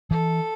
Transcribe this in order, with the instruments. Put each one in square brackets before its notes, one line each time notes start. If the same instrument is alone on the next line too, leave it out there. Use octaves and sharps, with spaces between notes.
[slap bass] E3 [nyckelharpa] A4